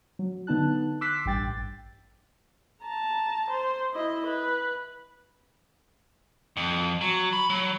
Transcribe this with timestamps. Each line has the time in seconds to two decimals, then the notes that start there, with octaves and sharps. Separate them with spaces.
0.19 F#3
0.47 D3 B3 D#4 A5 F#6
1.01 C6 D6 E6 F#6 B6 C7
1.25 A1 G2 G5 A6
2.82 A5 A#5
3.50 C5
3.94 E4 D#5
4.27 B4
6.57 F2
7.01 F#3
7.33 B5
7.50 F#3